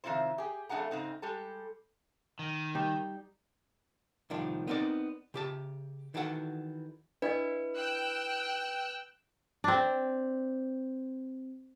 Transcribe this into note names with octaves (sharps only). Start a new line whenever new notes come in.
C3 D#3 F3 C4 E4 C5
G4 G#4
F2 A3 D4 G#4 F#5 A#5
G#2 C#3 C4 D#4
G3 G#3 G4 A4
D#3
G3 D#4 G4
C2 A2 D#3 F3 D4
B3 C4 D#4 A#4 D5
C#3 G4 A5
D#3 E3 D4 F#4 A4 F#5
D4 E4 B4 D5 D#5
G5 E6 F#6
C4 D4